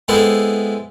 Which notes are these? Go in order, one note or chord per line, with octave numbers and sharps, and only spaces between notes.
G#3 B3 C4 E4 A4